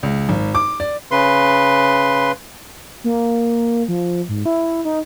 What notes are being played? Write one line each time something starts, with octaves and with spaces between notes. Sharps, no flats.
C#2
G#1
D6
D5
C#3 B4 C6
A#3
F3
G#2
E4
D#4